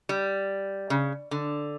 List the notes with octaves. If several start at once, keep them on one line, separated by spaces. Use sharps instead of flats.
G3
C#3
D3